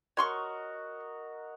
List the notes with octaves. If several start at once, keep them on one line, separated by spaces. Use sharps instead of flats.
F#4 A#4 C#5 D#5 C6 C#6